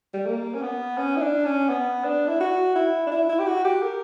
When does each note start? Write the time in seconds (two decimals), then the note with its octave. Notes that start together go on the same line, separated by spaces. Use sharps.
0.14 G3
0.26 A#3
0.54 C#4
0.62 B3
0.98 C#4
1.17 E4
1.21 D4
1.45 C#4
1.69 B3
2.04 D4
2.28 E4
2.40 F#4
2.76 E4
3.07 D4
3.11 E4
3.29 E4
3.39 G4
3.47 F#4
3.65 G4
3.83 A#4